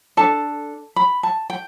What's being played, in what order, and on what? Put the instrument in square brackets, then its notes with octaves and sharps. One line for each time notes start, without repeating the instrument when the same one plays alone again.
[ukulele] D4 A4 A5
B5
A5
G5